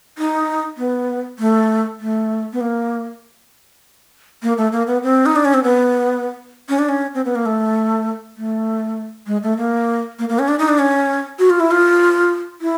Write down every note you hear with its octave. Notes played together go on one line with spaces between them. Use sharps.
D#4
B3
A3
A3
B3
A#3
A#3
A3
A#3
B3
C4
D#4
D4
C#4
C4
B3
C#4
D4
C#4
C4
B3
A#3
A3
A3
G#3
A3
A#3
A#3
A#3
C#4
D4
D#4
D4
C#4
F#4
F4
E4
F4
E4